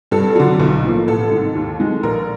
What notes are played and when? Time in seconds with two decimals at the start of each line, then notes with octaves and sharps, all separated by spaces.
0.11 G2 A4
0.35 D3 F#3
0.59 B1
0.84 A2 F3 A#3
1.07 A1 A4
1.31 G#2 D#3
1.55 D#2
1.79 D#3 G#3
2.03 A#1 A#4